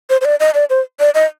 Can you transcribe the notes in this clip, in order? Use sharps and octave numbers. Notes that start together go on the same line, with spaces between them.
C5
C5
D5
D#5
D5
C5
D5
D#5